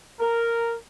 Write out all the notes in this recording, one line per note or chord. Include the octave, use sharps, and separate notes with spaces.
A#4